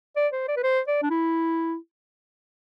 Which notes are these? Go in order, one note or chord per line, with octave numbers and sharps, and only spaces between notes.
D5
C5
D5
B4
C5
D5
D4
E4